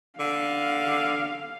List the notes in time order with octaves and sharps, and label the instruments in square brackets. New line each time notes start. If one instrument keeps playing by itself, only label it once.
[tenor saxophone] D3 [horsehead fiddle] F5